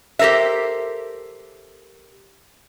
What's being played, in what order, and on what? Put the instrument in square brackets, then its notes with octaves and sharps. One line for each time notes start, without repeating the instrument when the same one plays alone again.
[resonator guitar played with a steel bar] G4 A4 A#4 C5 E5